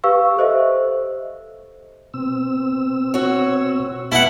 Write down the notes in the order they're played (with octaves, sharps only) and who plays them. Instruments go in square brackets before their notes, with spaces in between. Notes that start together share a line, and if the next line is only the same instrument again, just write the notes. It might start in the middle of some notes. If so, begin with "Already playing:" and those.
[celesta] G4 B4 F5 C#6 E6
G4 A4 C5 D#5 E5
[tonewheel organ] B2 C4 E6
[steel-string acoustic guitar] F#4 C#5
[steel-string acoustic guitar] B2 [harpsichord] E4 F#5